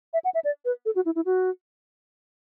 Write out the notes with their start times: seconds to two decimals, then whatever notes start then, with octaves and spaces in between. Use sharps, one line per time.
0.13 E5
0.24 F#5
0.34 E5
0.44 D5
0.65 B4
0.85 A4
0.95 F#4
1.05 E4
1.16 E4
1.25 F#4